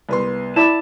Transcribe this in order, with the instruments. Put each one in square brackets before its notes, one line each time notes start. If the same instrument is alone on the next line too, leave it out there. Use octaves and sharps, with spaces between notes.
[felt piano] C2 B3 C6
[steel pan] E4 D5 [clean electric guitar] A5